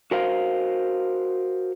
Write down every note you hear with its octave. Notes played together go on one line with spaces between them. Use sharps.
F#4 A#4 C5 F5